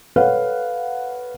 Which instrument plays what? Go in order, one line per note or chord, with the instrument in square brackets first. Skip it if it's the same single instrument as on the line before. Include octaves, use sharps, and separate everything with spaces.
[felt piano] A4 B4 C#5 F5 F#5